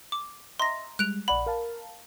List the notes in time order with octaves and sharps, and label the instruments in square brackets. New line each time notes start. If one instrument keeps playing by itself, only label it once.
[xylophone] D6
[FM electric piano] D#5 E5 A#5 [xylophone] C6 A#6
[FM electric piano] G3 G#3 [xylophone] F#6 D7 F7
[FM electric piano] A#1 D5 F#5 [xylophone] B5
[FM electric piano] A#4 F5 A5